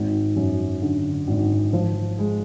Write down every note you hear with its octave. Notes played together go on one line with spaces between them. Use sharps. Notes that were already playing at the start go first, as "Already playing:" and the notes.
Already playing: G#1
F#2
D3
G#1
F3
G#3